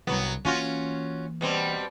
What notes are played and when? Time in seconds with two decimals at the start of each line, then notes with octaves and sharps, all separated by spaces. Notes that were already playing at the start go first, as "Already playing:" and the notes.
0.07 C2 G2 F#3 B3
0.45 E3 A#3 C#4 F4 F#4
1.41 B2 G3 C4